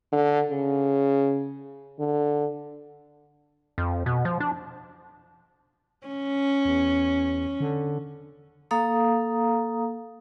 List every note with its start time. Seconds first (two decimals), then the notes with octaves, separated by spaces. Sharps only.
0.12 D3
0.51 C#3
1.99 D3
3.78 F2
4.06 B2
4.25 F3
4.40 D4
6.07 C#4
6.65 E2
7.60 D3
8.71 A#3 A4 F5 A#5 D#6